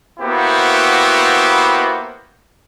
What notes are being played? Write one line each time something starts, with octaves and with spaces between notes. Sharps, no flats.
A#3 B3 E4 F#4 G4 C5